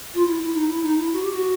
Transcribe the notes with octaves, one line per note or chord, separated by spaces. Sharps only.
F4
E4
E4
D#4
E4
D#4
E4
F#4
G4
F#4